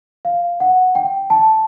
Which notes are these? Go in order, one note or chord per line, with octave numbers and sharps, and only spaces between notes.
F5
F#5
G5
A5